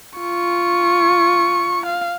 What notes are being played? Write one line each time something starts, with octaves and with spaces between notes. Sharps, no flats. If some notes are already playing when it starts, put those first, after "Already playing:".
F4 C#6
F5